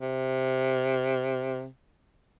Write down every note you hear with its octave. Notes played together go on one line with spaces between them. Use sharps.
C3